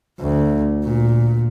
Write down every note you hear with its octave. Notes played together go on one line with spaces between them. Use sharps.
D2
A#2